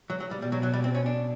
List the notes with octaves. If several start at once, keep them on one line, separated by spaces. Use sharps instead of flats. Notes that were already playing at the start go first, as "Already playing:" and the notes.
F#3
F#3
G3
B2 G3
F#3
F#3
G3
C4
C#4
D4